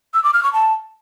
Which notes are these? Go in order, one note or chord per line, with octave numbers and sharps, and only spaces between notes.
E6
D6
F6
C#6
A5